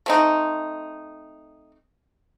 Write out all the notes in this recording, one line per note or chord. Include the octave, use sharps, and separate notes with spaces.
A3 C4 D#4